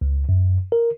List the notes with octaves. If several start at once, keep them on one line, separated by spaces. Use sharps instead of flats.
C#2
F#2
A#4